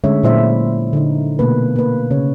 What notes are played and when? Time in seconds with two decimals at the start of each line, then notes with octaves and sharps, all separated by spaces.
0.04 D3 G#3 A3 C#4 C#5 E5
0.23 A#2 F#3 E4 C5 D5 E5
0.93 D3 D#4
1.39 B2 A3 A#3 B4
1.76 A#3 B4
2.11 C#3 C#5